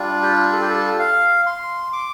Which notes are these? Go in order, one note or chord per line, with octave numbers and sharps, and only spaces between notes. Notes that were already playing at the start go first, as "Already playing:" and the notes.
Already playing: G3 D4 F4
G4
A4
G4
A4
F5
C6
D6